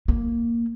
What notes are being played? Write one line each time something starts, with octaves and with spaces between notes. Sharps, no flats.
A#3